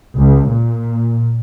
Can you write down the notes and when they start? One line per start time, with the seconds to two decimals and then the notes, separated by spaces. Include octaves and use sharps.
0.16 C#2
0.50 A#2